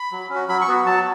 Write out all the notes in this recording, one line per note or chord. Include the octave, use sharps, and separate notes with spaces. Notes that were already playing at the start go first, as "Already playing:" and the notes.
Already playing: B5
F#3
C#4
F#4
F#3 B5
C#6
B3 F#4
F#3 A5